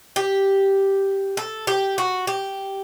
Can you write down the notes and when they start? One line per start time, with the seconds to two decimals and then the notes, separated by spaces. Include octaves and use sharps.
0.16 G4
1.37 A4
1.67 G4
1.98 F#4
2.27 G4